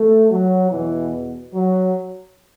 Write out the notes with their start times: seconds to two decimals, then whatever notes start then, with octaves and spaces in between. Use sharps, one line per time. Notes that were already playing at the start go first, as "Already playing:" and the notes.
Already playing: A3
0.30 F#3
0.70 E2 B2 E3
1.54 F#3